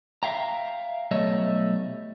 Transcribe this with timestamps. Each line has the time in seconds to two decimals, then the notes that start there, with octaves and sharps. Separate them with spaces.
0.23 E5 F5 G5 A#5
1.11 B1 G3 A3 C#5 D#5 E5